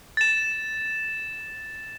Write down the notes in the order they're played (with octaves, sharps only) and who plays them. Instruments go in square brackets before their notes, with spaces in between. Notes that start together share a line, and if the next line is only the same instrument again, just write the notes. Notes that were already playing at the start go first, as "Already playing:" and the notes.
[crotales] A6 E7